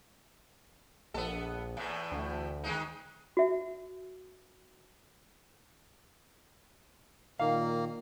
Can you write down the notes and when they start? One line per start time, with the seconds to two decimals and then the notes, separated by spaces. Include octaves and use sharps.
1.14 A#1 B3 A4
1.77 E2 A2 E3
2.12 D2
2.64 D#3 G#3 D#4
3.37 F#4 E5
7.39 A#2 D#3 A#3 F5